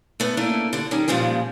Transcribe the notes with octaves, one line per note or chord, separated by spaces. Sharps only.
A3 B3
A3 A#3 C#4 D4 E4 D5
G2 D3
D#3 G3 C#4
A#2 C#3 F3 G3 G#3